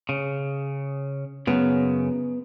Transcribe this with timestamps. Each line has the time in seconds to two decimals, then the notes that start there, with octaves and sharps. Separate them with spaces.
0.09 C#3
1.47 F#2 C#3 B3